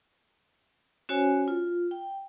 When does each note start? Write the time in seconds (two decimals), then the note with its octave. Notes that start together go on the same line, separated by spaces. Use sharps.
1.09 C#4 F#4 C5 C#5 G#5
1.48 F4
1.91 G5